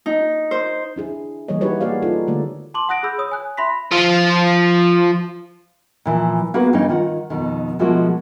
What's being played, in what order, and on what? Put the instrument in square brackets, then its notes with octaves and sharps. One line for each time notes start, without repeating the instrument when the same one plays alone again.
[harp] D#4
C5
[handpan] D4 E4 G#4
E3 G3 A#3 G#4 C#5 D#5
D#4 E4 F#4 G4 B4 C#5
A#3 F#4 G#4 D5 F5
A#3 D#4 F4 A4
D3 G3 A3 A#3 D5
[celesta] A5 C6 D6 F#7
F#5 D#6 F#6 A#6 D7
G#4 B5 E6 G6
C#5 D#6
G#5 F#6
E5 B5 C6 A#6 B6
[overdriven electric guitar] F3 F4
[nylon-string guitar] A#2 E3 F3
A#3 B3 F#4 G#4 B4
G2 C#3 E3 C#4 D#4
D#3 F4 F#5
F2 B2 D#3
B2 F3 G#3 A#3 E4 F#4